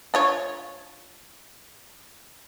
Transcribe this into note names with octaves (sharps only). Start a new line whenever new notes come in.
D4 F4 C#5